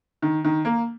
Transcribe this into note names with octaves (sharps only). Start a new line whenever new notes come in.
D#3
D#3
A#3